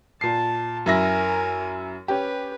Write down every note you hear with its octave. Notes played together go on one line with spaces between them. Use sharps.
A#2 A5 C7
F#2 E4 A#4 G#5 A#6
C#4 G4 B4